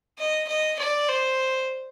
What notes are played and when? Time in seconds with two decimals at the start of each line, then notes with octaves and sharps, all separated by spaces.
0.19 D#5
0.48 D#5
0.79 D5
1.09 C5